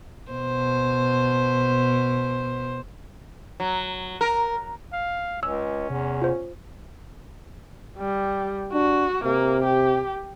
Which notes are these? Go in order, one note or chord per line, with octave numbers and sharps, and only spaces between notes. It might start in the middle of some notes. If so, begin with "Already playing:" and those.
B2 C5
F#3
A#4
F5
C#2 C#4 C#5 G#5 E6
E2 C3
F4 C5
G3
D4 F#4
C3 A#3
G4